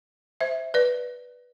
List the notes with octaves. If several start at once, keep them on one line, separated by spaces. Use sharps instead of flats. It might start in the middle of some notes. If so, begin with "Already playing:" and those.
C5 E5
B4 D5